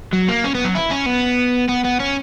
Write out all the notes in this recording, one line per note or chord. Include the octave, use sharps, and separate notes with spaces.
F#3
A#3
C#4
B3
F#3
E4
C#4
B3
B3
B3
C#4